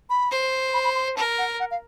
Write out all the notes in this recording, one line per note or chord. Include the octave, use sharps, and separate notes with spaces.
B5
C5
B5
B5
C6
A#4 A5
F#5
F#5
F5